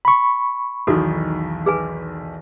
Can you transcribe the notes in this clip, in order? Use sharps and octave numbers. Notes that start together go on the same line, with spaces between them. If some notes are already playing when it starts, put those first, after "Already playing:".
B5 C#6
B1 E2 D#3 F#4 A4
G#4 B4 G#5